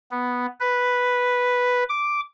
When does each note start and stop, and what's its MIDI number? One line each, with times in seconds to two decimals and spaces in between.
0.11 0.46 59
0.60 1.84 71
1.89 2.20 86